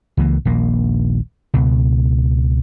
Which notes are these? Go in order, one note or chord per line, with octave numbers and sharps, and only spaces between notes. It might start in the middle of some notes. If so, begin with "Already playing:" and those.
C#2 E3 A#3
D#1 A#1 A#3
C#2 B2